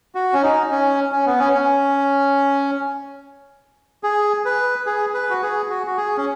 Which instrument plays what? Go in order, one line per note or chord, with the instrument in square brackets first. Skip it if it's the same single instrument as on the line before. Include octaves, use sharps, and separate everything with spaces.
[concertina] F#4
C#4
D#4
C#4
C#4
B3
C#4
C#4
G#4
B4
G#4
B4
F#4
G#4
F#4
F#4
G#4
C#4